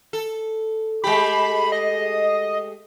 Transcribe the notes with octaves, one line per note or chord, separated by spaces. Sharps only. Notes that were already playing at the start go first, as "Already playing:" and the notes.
A4
G#3 A3 G4 B5
D#5